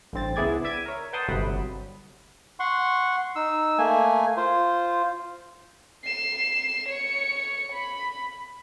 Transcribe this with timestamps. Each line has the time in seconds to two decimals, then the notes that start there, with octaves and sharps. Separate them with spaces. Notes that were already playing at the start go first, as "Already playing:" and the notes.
0.13 A1 G2 C4 A6
0.36 C#2 B3 E4 G#4 D5 G#6
0.64 D5 E5 G#6 D7 D#7
0.86 A#4 C#5
1.13 B4 F#5 G5 A5 C6 D#6
1.28 G1 C3 F#3 F#5 B5 D#6
2.60 F#5 C6 C#6
3.36 D#4 E6
3.78 A3 A#3 G#5
4.37 F4 C5
6.04 C7 E7
6.89 C#5 C#7
7.72 B5